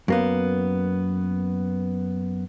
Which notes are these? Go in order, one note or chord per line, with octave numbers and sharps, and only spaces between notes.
F#2 A#3 B3